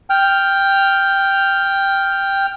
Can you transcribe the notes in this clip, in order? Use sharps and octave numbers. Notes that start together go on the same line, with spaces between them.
G5 F6